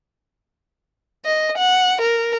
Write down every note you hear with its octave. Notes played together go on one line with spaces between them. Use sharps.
D#5
F#5
A#4